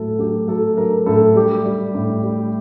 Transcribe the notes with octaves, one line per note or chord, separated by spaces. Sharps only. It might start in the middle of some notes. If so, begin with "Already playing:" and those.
Already playing: A2 F#3 A4
F#3 G4
F#3 A4
F#3 A#4
A2 A4
G3 G4
G3
A2
G3